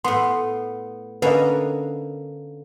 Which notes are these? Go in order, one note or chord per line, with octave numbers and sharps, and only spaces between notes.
A2 B3 C6
D3 A#3 C#4 B4 D#5